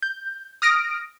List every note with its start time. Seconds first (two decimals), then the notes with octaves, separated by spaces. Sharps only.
0.02 G6
0.62 D#6 F6 A#6 D7